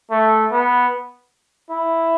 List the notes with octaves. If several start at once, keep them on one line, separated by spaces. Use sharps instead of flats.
A3
B3
E4